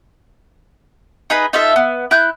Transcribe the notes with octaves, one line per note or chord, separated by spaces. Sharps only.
D#4 G#4 B4 B5
D#4 F4 A4 E5
B3
E4 F#6 G6